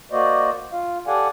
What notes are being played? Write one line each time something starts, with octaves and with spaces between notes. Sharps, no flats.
A#3 F#4 C5 D5 D#5
F4 F5
G4 A4 D5 F5 F#5 G#5